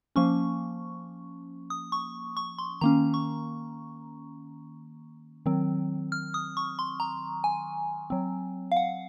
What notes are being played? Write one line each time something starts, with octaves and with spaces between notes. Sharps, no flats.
F3 A#3 C#4 C#6
D#6
C#6
C#6
C6
D#3 A#3 C#4 A#5
C#6
D#3 F#3 C4
F6
D#6
C#6
C6
A#5
G#5
F#3 C4
F5
F#5